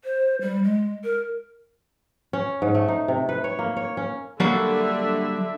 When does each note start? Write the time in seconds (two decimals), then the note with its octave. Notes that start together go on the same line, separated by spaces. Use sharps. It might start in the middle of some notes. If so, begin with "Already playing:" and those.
0.05 C5
0.42 G3
0.64 G#3
1.04 A#4
2.33 C#4
2.62 G#2
2.74 A3
2.88 D#4
3.08 C3
3.29 B4
3.44 C#5
3.59 A#3
3.76 C#5
3.97 C#4
4.40 D3 F#3 G3 A#3 D4 E5